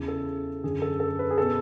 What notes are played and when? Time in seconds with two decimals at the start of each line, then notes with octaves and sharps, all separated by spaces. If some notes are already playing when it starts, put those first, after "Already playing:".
Already playing: E2 C#3 E3
0.08 A4
0.64 F#2 D3 G#4
0.82 A4
1.00 A4
1.19 B4
1.31 G#4
1.38 B2 A4